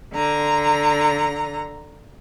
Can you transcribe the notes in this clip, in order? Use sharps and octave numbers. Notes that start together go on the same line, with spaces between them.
D3 A#5